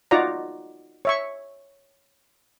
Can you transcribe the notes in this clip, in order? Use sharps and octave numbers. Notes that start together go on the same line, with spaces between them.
D#4 F4 F#4 D5 F#5 A#5
C#5 E5 C#6